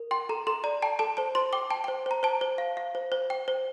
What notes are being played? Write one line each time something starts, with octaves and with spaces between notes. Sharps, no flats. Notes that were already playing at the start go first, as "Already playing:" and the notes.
Already playing: A#4
G5 C6
A4 A#5
A4 C6
D5 A#5
G5 A5
A4 A5
C5 A5
C5 C6
G5 D6
G5 A5
G5
C5
C5 A#5
C5 A5
C5
F5
F5
C5
C5
G5
C5